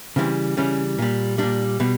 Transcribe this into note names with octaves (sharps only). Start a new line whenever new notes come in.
C#3 E3 G3 C4
C#3 E3 G3 C#4
A#2 G3
A#2 G3 D4
B2 G3